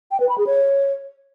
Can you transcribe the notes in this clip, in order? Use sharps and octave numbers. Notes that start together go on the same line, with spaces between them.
G5
B4
B5
G#4
C#5